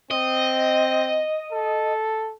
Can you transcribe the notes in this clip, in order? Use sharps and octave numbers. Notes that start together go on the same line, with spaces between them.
C4 D#5
A4